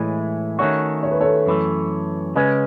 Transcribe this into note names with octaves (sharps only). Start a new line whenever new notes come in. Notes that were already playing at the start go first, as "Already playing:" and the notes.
Already playing: A2 E3 G#3 C#5 E5
D#3 A3 C#4 F#4 C#5 E5
C#5
B4
A4 C#5
F#2 E3 A3
C#3 G#3 C#4 B4 D#5